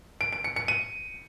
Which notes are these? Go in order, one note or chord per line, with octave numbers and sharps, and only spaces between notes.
D7
D7
C#7
C#7
D#7